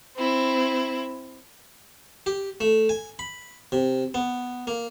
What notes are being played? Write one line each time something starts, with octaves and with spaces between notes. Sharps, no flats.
C4 E4
G4
A3
G#5
B5
C3
B3
A#3